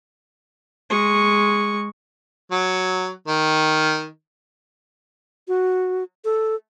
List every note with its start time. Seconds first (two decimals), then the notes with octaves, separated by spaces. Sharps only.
0.90 G#3 C#6
2.52 F#3
3.27 D#3
5.48 F#4
6.25 A4